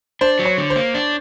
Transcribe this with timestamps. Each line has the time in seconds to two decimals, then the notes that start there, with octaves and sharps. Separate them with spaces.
0.21 D4 C5
0.39 F#3
0.45 C#5
0.58 D3
0.70 C5
0.76 A#3
0.94 D4